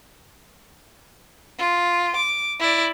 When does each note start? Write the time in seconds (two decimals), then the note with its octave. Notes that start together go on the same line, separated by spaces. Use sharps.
1.58 F4
2.16 D6
2.60 E4 D5